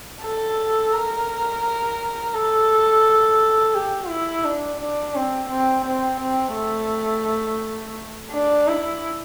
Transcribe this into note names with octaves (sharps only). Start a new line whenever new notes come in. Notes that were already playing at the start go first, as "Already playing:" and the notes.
A4
A#4
A4
G4
E4
D4
D4
C4
C4
C4
C4
A3
D4
E4